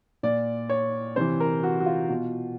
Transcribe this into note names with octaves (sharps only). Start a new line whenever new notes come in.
A#2 D5
C#5
C3 E3 C5
A#4
F#4
F#4
F4
B2